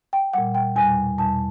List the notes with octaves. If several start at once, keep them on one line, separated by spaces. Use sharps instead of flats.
G5
A#2 G3 F#5
G5
E2 B2 G3 G#5
E2 B2 G3 A5